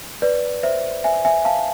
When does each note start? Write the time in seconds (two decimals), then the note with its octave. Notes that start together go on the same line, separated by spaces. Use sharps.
0.22 B4 D5
0.63 C5 E5
1.04 E5 G#5
1.25 E5 G#5
1.45 F5 A5